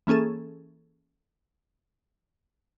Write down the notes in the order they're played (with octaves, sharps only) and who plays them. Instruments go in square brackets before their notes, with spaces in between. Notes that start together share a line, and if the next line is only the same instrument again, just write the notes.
[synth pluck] E3 A#3 C#4 G#4 A4